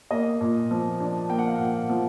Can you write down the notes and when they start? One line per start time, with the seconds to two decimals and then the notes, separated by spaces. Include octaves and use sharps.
0.11 A#3 D#5
0.41 A#2
0.71 F3
1.00 D4
1.29 A#3 G5
1.38 F#5
1.47 F5
1.56 A#2 F#5
1.90 F3